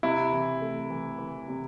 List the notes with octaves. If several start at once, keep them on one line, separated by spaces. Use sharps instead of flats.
C3 E4
E3
A3
E3
E3
C3